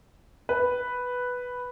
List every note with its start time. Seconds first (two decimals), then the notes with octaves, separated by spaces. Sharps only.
0.49 B4